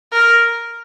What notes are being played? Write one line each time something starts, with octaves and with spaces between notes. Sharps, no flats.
A#4